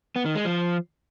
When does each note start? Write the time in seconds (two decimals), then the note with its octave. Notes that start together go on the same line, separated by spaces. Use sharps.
0.16 B3
0.25 D#3
0.35 G#3
0.45 F3